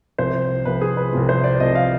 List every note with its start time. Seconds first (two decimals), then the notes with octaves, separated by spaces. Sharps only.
0.18 C2 C3 F3 C5
0.65 C2 C3 F3 B4
0.81 G#4
0.97 B4
1.13 C2 C3 F3
1.29 C5
1.44 D5
1.60 C2 C3 F3 D#5
1.75 F5